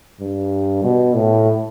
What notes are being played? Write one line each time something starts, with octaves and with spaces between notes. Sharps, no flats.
G2
B2
A2